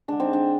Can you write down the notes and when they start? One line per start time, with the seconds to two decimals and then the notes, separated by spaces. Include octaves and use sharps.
0.08 D3 G#3 D4
0.20 C4 D#4
0.33 D4